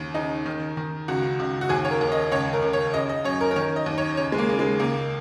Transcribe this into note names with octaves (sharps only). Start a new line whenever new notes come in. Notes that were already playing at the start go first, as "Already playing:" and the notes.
Already playing: D#2 C#3
C#3 D#4
D#3
D#3
C#2 F#4
C#2
F#4
D#2 G#4
C#5
A#4
D#2
D#5
C#2 C#5
A#4
C#2
C#5
C#3 D#5
D#5
F#2 C#5
A#4
A#4
D#3 C#5
D#5
D#2
C#5
C#3 C#5
G#3
A#3
C#3
G#3
C#2 A#3